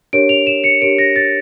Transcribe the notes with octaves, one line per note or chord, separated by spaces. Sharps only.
D4 G4 A#4 C#5 D7
F7
E7
C#7
D4 G4 A#4 C#5 D7
A#6
A6